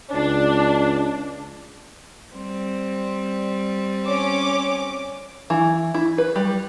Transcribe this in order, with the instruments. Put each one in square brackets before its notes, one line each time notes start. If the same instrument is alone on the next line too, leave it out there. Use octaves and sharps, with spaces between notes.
[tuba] C#2 [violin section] D4
[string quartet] G3 C4
[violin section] C#4 D6
[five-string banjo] E3
E4
B4
G3